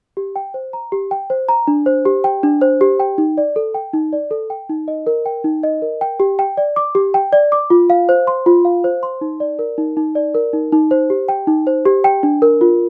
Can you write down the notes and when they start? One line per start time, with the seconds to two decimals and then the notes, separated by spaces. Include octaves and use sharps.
0.17 G4
0.36 G5
0.54 C5
0.73 A#5
0.92 G4
1.11 G5
1.30 C5
1.49 A#5
1.68 D4
1.86 C5
2.05 G4
2.24 G5
2.43 D4
2.61 C5
2.81 G4
3.00 G5
3.18 D#4
3.38 D5
3.56 A4
3.74 G5
3.93 D#4
4.13 D5
4.31 A4
4.50 G5
4.69 D#4
4.88 D#5
5.07 A#4
5.26 G5
5.44 D#4
5.63 D#5
5.82 A#4
6.01 G5
6.20 G4
6.39 G5
6.57 D5
6.76 D6
6.95 G4
7.14 G5
7.33 D5
7.52 D6
7.70 F4
7.90 F5
8.09 C5
8.27 C6
8.46 F4
8.65 F5
8.84 C5
9.03 C6
9.21 D#4
9.40 D5
9.59 A#4
9.78 D#4
9.97 D#4
10.15 D5
10.34 A#4
10.53 D#4
10.72 D#4
10.91 C5
11.10 G4
11.29 G5
11.47 D#4
11.67 C5
11.85 G4
12.04 G5
12.23 D4
12.42 A#4
12.61 F4